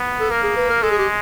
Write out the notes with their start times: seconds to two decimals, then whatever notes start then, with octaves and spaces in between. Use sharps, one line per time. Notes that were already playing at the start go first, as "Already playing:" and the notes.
Already playing: B3
0.20 A4
0.30 A#3 A#4
0.43 G#4
0.57 B4
0.70 A#4
0.83 G#3 A4
0.91 G#4
0.98 G4